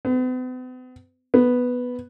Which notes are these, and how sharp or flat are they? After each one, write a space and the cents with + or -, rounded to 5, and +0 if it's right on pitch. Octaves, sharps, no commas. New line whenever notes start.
B3 +45
B3 +0